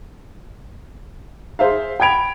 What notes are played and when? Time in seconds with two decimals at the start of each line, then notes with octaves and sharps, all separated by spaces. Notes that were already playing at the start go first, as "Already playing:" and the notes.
1.59 G#4 C5 E5 F5
2.00 G5 B5 G#6 D7 F7